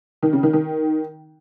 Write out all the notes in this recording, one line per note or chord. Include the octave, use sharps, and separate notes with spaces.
D#3
C#3
D#3
D#3